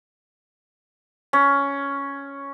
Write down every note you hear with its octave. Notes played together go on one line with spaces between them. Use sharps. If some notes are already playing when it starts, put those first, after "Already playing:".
C#4